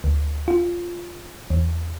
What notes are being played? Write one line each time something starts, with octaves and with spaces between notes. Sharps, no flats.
D2
F4
E2